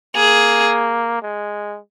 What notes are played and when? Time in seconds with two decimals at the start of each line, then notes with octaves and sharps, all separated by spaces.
0.16 A#3 G#4
1.22 G#3